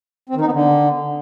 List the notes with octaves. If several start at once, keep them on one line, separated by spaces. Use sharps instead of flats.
C4
D#3
D#4
B3
D3